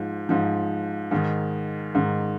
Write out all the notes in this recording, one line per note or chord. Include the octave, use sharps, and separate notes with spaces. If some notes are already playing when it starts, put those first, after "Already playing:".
Already playing: G#2 F3
G#2 F3
G#2 D#3
G#2 D#3